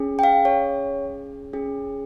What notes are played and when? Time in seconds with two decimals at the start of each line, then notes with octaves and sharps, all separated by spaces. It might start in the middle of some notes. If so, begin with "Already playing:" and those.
Already playing: C#4 G#4
0.19 G5
0.23 F5
0.45 C#5
1.53 C#4 G#4